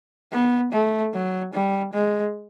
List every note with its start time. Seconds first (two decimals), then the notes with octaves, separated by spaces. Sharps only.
0.32 B3
0.73 A3
1.14 F#3
1.54 G3
1.94 G#3